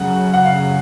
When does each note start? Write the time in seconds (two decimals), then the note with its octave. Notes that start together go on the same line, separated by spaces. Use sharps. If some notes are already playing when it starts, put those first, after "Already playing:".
Already playing: F#2 C#3 F#3 F#5
0.34 F#5
0.44 F5